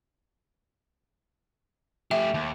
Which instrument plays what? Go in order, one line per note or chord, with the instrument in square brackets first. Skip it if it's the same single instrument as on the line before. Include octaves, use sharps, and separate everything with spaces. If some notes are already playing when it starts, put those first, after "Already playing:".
[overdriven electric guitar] A3 G4 [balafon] E5
[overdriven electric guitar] D#2